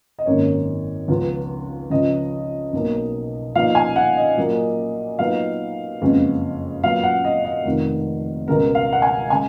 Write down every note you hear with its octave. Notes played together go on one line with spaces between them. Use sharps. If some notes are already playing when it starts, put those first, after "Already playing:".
D#5
G#1 F#2 D#3 A#3 C#4 C#5
C#2 C#3 F3 B3 F4
C#2 C#3 F3 D#5
B1 B2 A#3
A#2 F3 B3 D#4 F5
G#5
F#5
D#5
A#2 F#3 A#3
A#2 F#3 B3 D#4 F5
F#1 F2 C#3 G#3 B3
A#2 F#3 B3 F5
F#5
D#5
D#5
F1 F2 D#3
C#2 B2 G#3 B3 A#4
F5
F#5
G#5
C#3 G#3 G#5